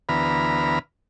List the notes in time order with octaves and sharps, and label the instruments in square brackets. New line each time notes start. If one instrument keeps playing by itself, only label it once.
[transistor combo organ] D2 E3 B3 A#5 B5 F6